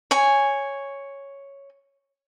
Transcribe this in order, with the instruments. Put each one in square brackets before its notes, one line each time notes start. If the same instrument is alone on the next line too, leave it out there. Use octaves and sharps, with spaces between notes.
[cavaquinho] C#5 G#5